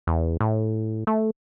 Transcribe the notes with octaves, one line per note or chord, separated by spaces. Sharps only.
E2
A2
A3